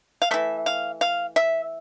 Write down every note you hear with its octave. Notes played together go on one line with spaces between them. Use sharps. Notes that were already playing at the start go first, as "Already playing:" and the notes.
F5
E3 A3 E5
F5
F5
E5